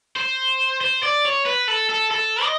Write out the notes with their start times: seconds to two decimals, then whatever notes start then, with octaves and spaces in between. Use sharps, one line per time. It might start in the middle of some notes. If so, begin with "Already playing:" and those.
0.16 C5
0.81 C5
1.03 D5
1.25 C#5
1.45 B4
1.68 A4
1.89 A4
2.11 A4
2.43 D#5